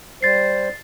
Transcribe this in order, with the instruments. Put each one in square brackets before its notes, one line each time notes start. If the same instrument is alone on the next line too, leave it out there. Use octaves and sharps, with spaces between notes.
[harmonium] G3 C5 [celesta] A6 C7